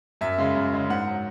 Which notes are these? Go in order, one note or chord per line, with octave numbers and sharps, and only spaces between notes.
F#2 E5
C#3 G#3
F#2
C#3 G#3
G#2 F#5
F#3